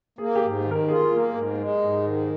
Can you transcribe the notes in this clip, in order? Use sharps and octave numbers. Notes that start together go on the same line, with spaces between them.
A#3 G#4
G4
G#2
D#3
A#4
F4 G#4
A#3
G#2
G#3
G#2
D#3